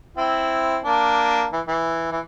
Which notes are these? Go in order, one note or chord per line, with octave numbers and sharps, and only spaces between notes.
C4 E4
A#3 D4
E3
E3
E3